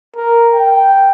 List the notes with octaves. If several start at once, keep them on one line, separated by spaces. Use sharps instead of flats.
A#4
G5